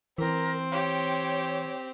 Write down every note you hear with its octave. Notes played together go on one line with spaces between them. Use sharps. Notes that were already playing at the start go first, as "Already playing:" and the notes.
E3 C4 A#4
G4 C#5